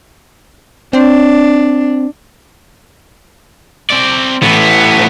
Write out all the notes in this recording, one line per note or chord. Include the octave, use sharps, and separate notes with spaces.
C4 D4
C4 D5
A2 E3 B3